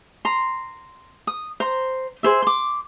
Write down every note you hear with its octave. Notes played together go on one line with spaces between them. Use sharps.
A#5 C6
D#6
C5 A#5
G#4 C5 E5
C6 D6